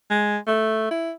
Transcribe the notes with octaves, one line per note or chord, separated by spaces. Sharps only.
G#3
A3
E4